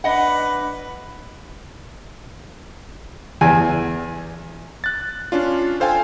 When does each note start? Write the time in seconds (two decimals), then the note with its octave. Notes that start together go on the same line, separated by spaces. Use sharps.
0.04 D4 B4 D#5 F#5
3.41 E2 G#5
4.84 F#6 A6
5.32 C#4 D4 F4
5.80 A4 C5 F5 G5 G#5